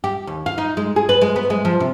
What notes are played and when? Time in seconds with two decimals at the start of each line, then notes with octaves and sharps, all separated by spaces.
0.04 G4
0.27 D#2
0.46 F5
0.58 D#4
0.77 G#3
0.96 G#4
1.09 B4
1.22 G#3
1.36 B3
1.50 G#3
1.65 F3
1.80 C3